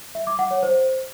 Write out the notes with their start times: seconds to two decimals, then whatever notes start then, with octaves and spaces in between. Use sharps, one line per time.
0.15 E5
0.27 D6
0.39 F#5
0.51 C#5
0.63 C5